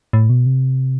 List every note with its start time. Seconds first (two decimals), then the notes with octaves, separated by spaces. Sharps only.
0.13 A2
0.30 B2
0.46 C3